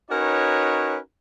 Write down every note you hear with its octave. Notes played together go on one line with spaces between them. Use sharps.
C#4 D#4 F#4 A#4 B4 C#5